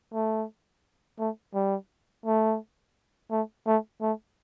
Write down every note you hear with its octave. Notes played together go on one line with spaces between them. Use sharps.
A3
A3
G3
A3
A3
A3
A3